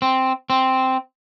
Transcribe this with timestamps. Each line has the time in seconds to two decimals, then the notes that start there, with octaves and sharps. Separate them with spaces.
0.02 C4
0.50 C4